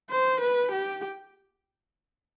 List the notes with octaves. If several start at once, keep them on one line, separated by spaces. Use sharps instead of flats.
C5
B4
G4